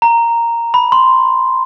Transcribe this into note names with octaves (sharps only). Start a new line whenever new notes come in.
A#5
B5
C6